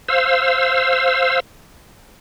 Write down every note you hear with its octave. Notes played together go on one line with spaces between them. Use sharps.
C5 F5 E6